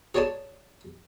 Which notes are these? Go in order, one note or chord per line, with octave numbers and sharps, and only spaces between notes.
G#4 C#5 D5 G#5 A5